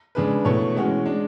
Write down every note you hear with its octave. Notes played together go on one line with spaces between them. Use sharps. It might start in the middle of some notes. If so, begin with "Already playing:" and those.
C#3 G#3 D4 G#4 B4
B2 A3 E4 A4 C#5
E3 G#3 C#4 F#4
G#3 D4